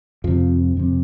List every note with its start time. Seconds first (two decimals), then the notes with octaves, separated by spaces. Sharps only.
0.24 F2 C3 F3
0.77 F2 C3